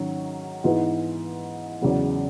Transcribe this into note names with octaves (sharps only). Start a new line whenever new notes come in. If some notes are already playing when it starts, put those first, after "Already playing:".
Already playing: G#2 D#3 F#3 C#4
G#2 E3 B3
E2 C#3 F#3